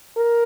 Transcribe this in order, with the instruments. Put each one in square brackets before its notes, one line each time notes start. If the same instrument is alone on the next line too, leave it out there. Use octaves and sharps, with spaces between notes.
[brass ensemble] A#4